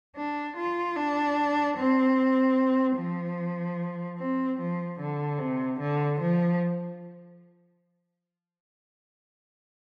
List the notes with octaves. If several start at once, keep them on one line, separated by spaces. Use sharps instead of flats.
D4
F4
D4
C4
F3
C4
F3
D3
C3
D3
F3